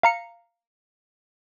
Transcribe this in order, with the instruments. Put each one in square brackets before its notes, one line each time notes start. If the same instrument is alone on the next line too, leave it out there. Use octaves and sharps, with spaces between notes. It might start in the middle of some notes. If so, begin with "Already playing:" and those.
[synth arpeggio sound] F5 A#5 C#7